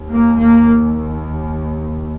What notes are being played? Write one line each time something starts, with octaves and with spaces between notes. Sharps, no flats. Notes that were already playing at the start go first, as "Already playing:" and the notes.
Already playing: D#2
A#3
A#3